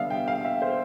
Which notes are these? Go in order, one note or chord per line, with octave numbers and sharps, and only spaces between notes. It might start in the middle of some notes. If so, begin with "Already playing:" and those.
Already playing: D3 G3 B3 E5 F5
G5
F5
E5
C5